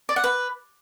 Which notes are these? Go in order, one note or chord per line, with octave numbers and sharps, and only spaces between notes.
D5
F#5
B4